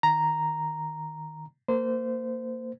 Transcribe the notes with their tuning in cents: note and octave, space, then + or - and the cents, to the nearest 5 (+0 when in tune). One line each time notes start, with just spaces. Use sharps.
D#3 +0 A#5 +0
A#3 -25 C5 -25